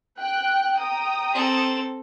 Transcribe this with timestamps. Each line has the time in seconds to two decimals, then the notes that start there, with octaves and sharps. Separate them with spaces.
0.19 G5 F#6
0.78 G5 A#5 D#6
1.33 C4 A4